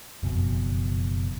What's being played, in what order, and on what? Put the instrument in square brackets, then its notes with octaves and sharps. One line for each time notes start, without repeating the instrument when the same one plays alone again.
[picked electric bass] F#1 F2 B2